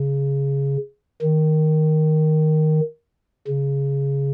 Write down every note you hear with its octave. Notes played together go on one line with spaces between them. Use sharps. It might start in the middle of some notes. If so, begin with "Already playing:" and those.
Already playing: C#3
D#3
C#3